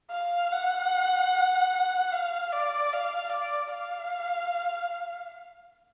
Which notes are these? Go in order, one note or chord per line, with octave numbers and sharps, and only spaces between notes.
F5
F#5
F5
D5
F5
D5
F5